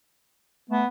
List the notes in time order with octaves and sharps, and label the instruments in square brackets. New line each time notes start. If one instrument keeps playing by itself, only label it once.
[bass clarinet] A3 [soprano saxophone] B3